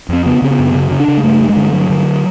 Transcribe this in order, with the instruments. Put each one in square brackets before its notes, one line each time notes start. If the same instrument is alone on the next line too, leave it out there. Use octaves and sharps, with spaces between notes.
[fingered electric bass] F2 C4
C#3 B3
C#3 C4
B3
F#2
C#3
C#3
D4
C#3
G#3
G2 A3
G2
G#3
D3
G2 F#3
D3